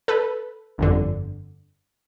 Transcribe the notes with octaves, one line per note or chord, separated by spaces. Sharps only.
A4 B4
G1 F2 D3